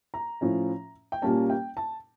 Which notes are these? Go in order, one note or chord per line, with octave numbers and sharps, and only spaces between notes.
A#5
A2 F3 C#4
G5
A#2 G3 A#3 C#4 A5
G5
A5